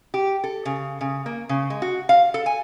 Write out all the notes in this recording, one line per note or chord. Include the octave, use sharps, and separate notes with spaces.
G4
A4
C#3
C#3
A#3
C#3
G#3
F#4
F5
A4
G#5